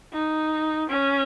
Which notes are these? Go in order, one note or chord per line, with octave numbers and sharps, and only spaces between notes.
D#4
C#4